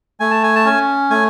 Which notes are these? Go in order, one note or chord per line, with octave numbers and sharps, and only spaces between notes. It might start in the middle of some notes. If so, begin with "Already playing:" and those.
A3 G#5
A5
G#5
A5
C#4 G#5
A3 G#5